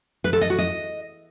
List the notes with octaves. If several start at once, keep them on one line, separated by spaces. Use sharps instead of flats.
B4
A4
D#5
F#4
D#5